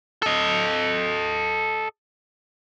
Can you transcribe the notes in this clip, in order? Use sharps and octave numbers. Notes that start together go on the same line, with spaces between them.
A4 D#5